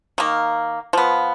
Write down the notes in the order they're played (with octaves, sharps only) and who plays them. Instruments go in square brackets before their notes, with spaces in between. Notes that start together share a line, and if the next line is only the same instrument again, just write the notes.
[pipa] D#3 A#3
F3 B3